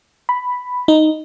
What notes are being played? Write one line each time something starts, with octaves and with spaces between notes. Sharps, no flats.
B5
D#4